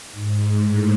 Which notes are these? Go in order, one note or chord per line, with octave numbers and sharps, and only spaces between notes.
G#2
A2